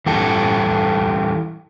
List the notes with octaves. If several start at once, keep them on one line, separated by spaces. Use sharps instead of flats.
E3 G3 G4 A4